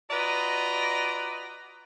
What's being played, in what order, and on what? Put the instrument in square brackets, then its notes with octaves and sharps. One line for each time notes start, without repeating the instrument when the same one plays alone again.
[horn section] F4 F#4 B4 D5 D#5 A#5